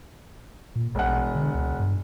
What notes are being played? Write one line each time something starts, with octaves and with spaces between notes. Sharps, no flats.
A#2
E1 A#1 F#5
D3
C#2
G2